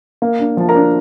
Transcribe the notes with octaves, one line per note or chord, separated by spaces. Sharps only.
A#3
D4
F3 A5
A#4 A#5
D4